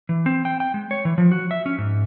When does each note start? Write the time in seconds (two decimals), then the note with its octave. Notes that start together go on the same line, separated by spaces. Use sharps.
0.09 E3
0.26 C4
0.45 G5
0.60 G5
0.74 G#3
0.91 C#5
1.05 E3
1.18 F3
1.32 F#4
1.51 E5
1.66 C#4
1.78 G#2